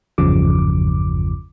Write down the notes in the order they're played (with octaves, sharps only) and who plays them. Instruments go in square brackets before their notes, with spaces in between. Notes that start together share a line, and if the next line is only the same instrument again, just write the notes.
[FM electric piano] G#1 E2 G2 C#3 F3 D6